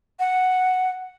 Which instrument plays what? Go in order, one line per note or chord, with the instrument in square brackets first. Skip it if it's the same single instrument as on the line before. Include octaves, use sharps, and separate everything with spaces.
[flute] F#5